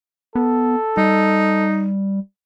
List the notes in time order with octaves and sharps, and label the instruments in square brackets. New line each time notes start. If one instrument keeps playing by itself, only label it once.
[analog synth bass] B3 [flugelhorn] A4
[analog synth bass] G3 [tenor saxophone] D#4